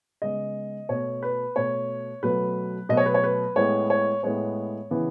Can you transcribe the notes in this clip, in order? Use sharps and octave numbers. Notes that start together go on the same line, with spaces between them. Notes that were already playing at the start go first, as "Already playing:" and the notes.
C#3 G#3 B3 D#5
B2 A3 C#5
B4
B2 A3 C#5
B2 F#3 A3 B4
B2 F#3 A3 D#5
C#5
B4
C#5
B4
A2 G#3 B3 C#5
C#5
A2 G#3 B3 C#5
C#3 E3 B3